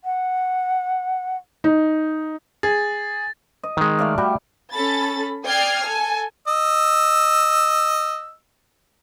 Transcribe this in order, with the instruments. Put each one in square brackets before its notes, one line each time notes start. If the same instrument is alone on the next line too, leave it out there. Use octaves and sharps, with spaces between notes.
[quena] F#5
[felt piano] D#4
[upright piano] G#4 [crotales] A6
[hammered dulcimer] D#5
[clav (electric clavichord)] D#3 G#3
[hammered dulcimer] A3 D5 F5
[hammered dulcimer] G3 [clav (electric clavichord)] F#4 G5
[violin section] C#4 A4 B5 A6
D5 G5 D#6 F6 G#6 C7
A4 G#5
[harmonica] D#5 E6